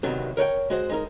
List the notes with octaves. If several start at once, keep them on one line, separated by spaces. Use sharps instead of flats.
C2 C3 D#3 F#3 B3
A#4 C#5 F#5 G5
G#3 F#4 C5
G#3 D#4 A#4